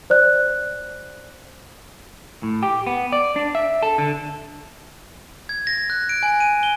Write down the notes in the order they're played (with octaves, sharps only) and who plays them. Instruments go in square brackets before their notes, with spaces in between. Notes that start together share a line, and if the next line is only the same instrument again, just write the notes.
[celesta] C5 D5 F#6
[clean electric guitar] A2
G4
B3
D5
D4
E5
A4
D3
[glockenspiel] G#6
A#6
F#6
D7
G#5
D#7
G7